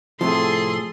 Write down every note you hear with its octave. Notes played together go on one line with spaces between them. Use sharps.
A2 C3 F3 G#4 A4 C6